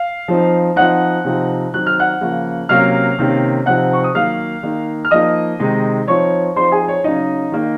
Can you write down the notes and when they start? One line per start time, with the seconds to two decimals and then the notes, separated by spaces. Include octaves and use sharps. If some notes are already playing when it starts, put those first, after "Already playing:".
Already playing: F5
0.28 F3 C4 D#4
0.76 F3 C4 D#4 F#5 F#6
1.24 C3 F3 C4 D#4
1.74 D#3 F#3 C4 D#4 F#6
1.87 F6
2.00 F#5 F#6
2.21 C#3 F3 A#3
2.69 C3 F#3 A#3 C#4 F5 F6
3.19 C3 D#3 A#3 C#4
3.66 C3 F3 C4 D#4 F#5 F#6
3.93 C#6
4.04 D#6
4.15 D#3 F#3 A#3 F5 F6
4.63 D#3 A#3 D#4
5.05 F6
5.11 F3 A#3 D#4 D#5 D#6
5.59 C3 D#3 G#3 D#4
6.07 F3 C4 D#4 C#5 C#6
6.56 F3 C4 D#4 C5 C6
6.72 G#4 G#5
6.88 C#5
7.04 C#3 F#3 C#4 D#4 D#5
7.52 D#3 A#3 D#4